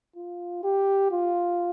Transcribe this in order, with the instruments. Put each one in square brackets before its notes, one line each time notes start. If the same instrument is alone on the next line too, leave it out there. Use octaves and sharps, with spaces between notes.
[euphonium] F4
G4
F4